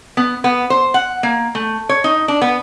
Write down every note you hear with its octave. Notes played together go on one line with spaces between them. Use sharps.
B3
B3
C5
F#5
A#3
A3
C#5
D#4
D4
B3